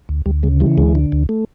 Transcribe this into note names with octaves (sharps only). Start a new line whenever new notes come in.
D2
D2 G3
C#3 G#3
E3 G3
D2 G#3
D3
D2
A3